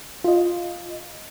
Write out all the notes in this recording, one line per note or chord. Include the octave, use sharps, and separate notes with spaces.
F4 D#5